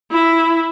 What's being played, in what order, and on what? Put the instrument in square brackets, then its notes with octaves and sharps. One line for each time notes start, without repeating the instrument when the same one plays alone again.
[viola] E4